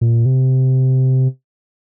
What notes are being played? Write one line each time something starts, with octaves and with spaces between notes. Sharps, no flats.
A#2
C3